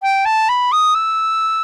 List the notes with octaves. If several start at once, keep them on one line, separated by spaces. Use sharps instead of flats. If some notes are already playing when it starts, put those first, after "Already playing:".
G5
A5
B5
D#6
E6